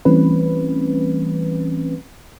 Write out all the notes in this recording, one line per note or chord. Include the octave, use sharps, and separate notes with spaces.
E3 G3 A3 C4 C#4 B4